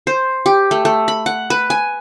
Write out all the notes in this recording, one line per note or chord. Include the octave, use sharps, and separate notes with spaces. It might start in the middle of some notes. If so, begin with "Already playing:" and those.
C5
G4
A3
A3
B5
F#5
B4
G#5